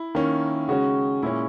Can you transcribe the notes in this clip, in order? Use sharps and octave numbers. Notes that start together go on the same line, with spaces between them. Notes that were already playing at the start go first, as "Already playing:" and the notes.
Already playing: E4
D#3 A#3 C#4
C#3 G#3 C#4 F#4
A#2 G#3 C#4 E4